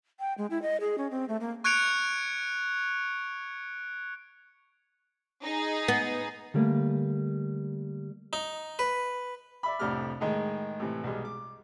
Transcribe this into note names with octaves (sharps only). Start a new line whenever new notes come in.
G5
G#3
E4
D#5
G#4
C#4
C4
A3
A#3
C#6 F#6 G#6 C#7 D7 F7
D#4 G#4
B3
D3 G3 A3 A#3
D#4
B4
D5 E5 B5
C2 F2 A2 D4 G4 F6
A2 D#3 G#3
A2 C3 E3
B1 G3 G#3
D6